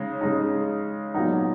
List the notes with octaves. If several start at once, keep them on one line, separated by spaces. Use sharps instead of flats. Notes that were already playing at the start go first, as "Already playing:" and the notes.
Already playing: C#3 G#3 D#4
C#3 G#3 D#4
A#2 F#3 B3 D#4